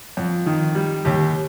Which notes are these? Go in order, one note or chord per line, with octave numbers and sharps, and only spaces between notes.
F2
D#3
G3
D#2 G4